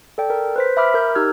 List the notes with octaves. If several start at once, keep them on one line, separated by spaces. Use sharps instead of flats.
A4 D5 G5
A#4
B4 C5 B6
E5 B5 D6 F6
A#4 G6
D#4 G4 E6 F6 G#6